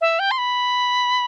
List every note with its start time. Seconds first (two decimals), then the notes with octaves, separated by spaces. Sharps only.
0.01 E5
0.19 G5
0.31 C6
0.38 B5